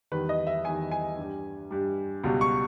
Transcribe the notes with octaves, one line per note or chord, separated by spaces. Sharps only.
E2 D#3 G3 B4
D#5
E5
E2 D#3 G3 G#5
G#5
G2 G3
G2 G3
C#2 B2 G3
C#6